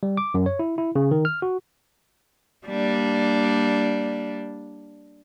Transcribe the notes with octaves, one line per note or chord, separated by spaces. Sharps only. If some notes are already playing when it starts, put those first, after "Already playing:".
G3
D6
F#2
C#5
E4
E4
C#3
D#3
F6
F#4
G3 A#3 D4